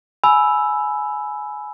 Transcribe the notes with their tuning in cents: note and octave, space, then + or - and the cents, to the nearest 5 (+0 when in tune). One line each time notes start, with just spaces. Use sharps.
G#5 +20 B5 +0 E6 +0